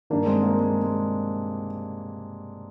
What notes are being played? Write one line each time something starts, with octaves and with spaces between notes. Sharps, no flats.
G2 D#3 A#3 D4
G#3 C4
A#3
G#3
G#3